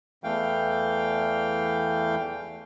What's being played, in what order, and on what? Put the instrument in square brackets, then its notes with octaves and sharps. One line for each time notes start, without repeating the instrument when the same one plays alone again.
[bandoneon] E2 E3 A3 F5 G5